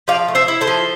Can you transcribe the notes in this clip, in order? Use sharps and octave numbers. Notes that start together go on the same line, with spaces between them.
F3 D5 F5
A3
C5 E5
E4
A4 C5
F3